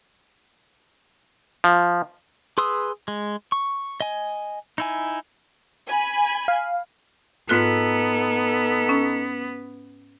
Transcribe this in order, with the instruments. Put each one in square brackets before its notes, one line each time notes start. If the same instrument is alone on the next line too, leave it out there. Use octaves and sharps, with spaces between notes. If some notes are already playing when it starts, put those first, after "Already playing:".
[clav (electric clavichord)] F3
[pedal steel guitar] G#4 B4 C6 D#6 E6
G#3
C#6
D#5 G#5
D#4 E4 G#5
[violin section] G#5 B5
[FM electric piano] F5
[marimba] G#2 F4 F#6 [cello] B3 [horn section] D#4 A4
[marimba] C#4